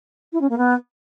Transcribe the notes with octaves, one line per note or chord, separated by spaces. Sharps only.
E4
C#4
A#3
B3